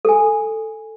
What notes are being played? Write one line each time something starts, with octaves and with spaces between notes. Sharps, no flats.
A4 G#5